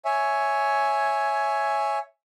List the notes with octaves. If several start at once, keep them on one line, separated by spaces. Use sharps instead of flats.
C#5 E5 G#5